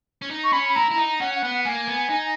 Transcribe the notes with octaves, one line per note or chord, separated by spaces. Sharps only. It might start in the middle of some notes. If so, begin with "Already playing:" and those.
C#4
D#4
C#6
C#4 B5
B5
E4 A#5
E4
D#4
C#4 F#5
F#5
B3
F#5
A#3 G#5
B3
D#4